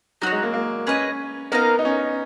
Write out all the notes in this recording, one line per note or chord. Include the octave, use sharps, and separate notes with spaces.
F#3 D#4 F#4 C#5
G#3
A#3
A#3
C#4 G#4 B4 D#5
A#3 B3 D#4 A#4 F5
D#4
C#4